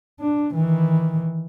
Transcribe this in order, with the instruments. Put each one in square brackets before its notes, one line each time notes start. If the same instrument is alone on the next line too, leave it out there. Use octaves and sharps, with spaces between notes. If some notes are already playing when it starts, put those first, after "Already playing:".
[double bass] D4
D#3 E3